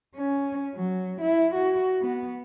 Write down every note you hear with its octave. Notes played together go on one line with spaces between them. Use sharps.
C#4
F#3
E4
F#4
B3